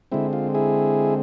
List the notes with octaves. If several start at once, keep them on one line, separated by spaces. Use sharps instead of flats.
D3 G#3 C4 E4
F4
E4 G#4